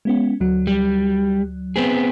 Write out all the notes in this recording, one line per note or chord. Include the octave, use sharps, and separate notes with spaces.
G#3 B3 C#4
D2 F#3
G3
B3 C4 G#4